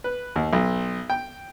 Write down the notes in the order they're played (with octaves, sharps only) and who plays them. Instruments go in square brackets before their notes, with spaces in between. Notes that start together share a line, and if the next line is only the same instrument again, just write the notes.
[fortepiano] B4
D#2
B1
G5